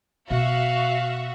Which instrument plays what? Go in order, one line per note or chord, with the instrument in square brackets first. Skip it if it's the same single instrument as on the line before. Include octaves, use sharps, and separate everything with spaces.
[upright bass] B2 [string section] F#4 E5 [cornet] F5